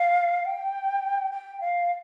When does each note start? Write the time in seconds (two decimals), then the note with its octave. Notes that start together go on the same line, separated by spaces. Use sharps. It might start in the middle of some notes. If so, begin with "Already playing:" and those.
Already playing: F5
0.45 G5
1.32 G5
1.61 F5